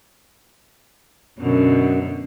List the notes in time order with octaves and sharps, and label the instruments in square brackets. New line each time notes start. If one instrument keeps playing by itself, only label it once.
[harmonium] F#2 [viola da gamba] B2 D3